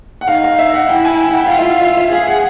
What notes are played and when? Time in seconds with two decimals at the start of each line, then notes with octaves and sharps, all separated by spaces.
0.21 F#5
0.28 D#4 F5
0.44 F5
0.59 E5
0.74 F#5
0.89 E4 G5
1.05 G#5
1.20 G5
1.30 F#5
1.40 G5
1.46 F5
1.50 F4 F#5
1.59 E5
1.66 F5
1.81 E5
1.97 E5
2.12 G#4 F5
2.27 F#5